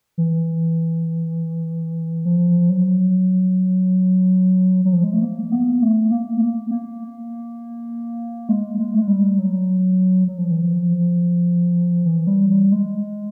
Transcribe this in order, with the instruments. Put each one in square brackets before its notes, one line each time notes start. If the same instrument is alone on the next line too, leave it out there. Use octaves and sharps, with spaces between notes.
[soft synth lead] E3
F3
F#3
F#3
F3
G#3
A3
A#3
B3
A3
A#3
A#3
A#3
G#3
G#3
A3
G#3
G3
F#3
F#3
F3
E3
F3
E3
G3
G3
G#3